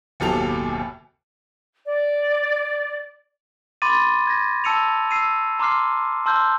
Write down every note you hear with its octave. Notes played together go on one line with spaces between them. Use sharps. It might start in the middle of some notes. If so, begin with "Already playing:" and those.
F#1 D#2 B2 G4 A4 F7
D5
B5 C6 D6 A6 D#7
G#6 A#6
A5 E6 C#7 D#7 F7
E6 C7 D#7
A#5 C6 D6 F6 C7
A5 C6 E6 F6 G6